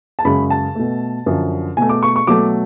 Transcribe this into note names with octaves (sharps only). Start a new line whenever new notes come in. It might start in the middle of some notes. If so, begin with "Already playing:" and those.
A5
F#2 C#3 G#3 B5
A5
B2 A3
F#2 D3 F3
B2 A3 G#5
D6
C#6
C#6
B2 F#3 A3 D6